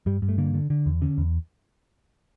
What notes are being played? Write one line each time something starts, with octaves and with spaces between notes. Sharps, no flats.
G2 G3
G2
A3
D3 A#3
D3
D3
E2
D3 C#4
E2